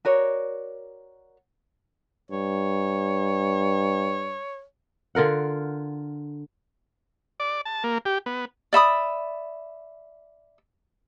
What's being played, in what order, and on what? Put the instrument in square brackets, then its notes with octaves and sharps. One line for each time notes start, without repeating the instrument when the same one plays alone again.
[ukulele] F#4 A#4 C#5 D5
[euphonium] G2 [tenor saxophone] C#5
[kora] D3 F4 A#4 F#5
[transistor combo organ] D5
A5
A#3
G4
B3
[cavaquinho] D5 E5 B5 D#6